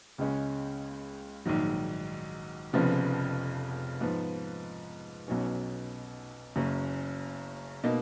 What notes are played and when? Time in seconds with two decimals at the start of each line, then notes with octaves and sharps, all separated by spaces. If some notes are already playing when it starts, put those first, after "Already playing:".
0.18 C#2 C#3 G#3 C#4
1.46 A#1 G#2 D#3 F#3
2.73 F1 F2 C#3 F3 B3
4.01 G#2 F3 B3
5.28 B1 B2 F#3 C#4
6.56 F#1 F#2 C#3
7.84 B2 A#3 D#4